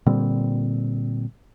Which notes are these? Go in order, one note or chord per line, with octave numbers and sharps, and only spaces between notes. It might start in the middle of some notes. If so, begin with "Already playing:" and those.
A#2 D3 G3 C4